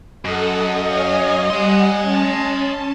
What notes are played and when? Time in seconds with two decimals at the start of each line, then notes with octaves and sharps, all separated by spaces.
0.25 F#2 A4 D#5 F#5
0.84 C#5 F5 G#5
1.50 G3 F#5 G#5 C6
2.01 C#4 A5